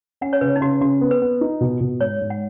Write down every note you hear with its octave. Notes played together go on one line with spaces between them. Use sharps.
C#4 F#5
C#5
C#3 B4
D#4
C#3 F#4
C#3 F#4
B3
B4
B3
D#4
B2
B2
G#2 C#5
G#2
F#5